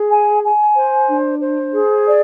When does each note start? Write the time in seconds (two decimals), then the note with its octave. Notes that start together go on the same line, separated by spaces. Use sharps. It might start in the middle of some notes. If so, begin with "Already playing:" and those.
Already playing: G#4
0.10 G#5
0.42 G#5
0.75 C5
1.08 D4
1.40 C5
1.72 G#4
2.06 D5